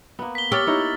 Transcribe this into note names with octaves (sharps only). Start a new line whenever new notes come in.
A#3 B3
B6 G7
G4 C#5 E6 F6 A6
D#4 E4 C#5